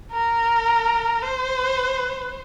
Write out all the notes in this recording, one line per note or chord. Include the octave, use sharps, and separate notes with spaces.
A#4
C5